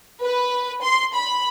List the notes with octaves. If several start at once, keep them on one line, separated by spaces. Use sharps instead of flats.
B4
C6
B5